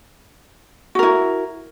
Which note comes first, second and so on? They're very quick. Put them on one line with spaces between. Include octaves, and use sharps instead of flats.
F#4 A#4 E4